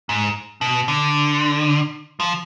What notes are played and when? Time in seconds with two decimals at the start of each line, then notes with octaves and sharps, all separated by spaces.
0.09 G#2
0.61 B2
0.88 D3
2.20 F3